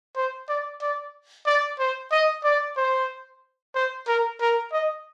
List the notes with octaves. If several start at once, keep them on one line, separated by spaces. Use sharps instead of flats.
C5
D5
D5
D5
C5
D#5
D5
C5
C5
A#4
A#4
D#5